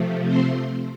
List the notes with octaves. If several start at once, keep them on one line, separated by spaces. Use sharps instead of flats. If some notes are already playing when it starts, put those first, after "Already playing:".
Already playing: C3 F3 A3
C4 C5